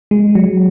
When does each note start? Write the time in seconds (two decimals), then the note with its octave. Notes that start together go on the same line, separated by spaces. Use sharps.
0.11 G#3
0.35 F#3